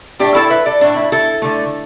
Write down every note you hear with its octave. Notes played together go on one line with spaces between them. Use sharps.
A2 A3 D4 G4
E4 A4
B4 E5
A4 D5
A2 A3 D4
E4
E4 A4
D3 A3